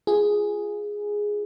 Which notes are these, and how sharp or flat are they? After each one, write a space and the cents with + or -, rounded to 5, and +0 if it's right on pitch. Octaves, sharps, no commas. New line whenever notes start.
F4 -10 G#4 +0